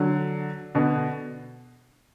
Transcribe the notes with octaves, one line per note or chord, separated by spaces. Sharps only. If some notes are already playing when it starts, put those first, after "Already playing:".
Already playing: D3 F#3
B2 D3